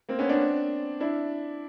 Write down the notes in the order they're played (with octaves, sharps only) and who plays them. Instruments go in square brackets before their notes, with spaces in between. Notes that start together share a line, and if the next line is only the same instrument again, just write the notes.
[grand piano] A#3 C4
B3 C#4
C4 D4
D4 E4